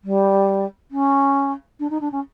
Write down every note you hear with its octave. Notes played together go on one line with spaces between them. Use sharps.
G3
C#4
D4
D#4
D4
C#4